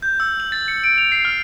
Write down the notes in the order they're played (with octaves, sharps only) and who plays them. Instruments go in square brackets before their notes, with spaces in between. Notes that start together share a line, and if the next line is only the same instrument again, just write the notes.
[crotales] G6
E6
F#7
A6
C#7
D7
F7
C7
F6